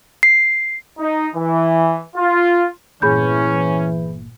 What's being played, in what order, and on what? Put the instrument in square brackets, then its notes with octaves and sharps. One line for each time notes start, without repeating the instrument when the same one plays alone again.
[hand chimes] C7
[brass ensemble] D#4
E3
F4
[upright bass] G1 A#2 [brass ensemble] E3 [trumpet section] C#4 [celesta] G#4 B5 G6